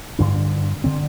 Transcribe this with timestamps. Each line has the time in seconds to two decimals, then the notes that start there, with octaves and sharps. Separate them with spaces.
0.19 G2 D3 D4
0.84 D3 C4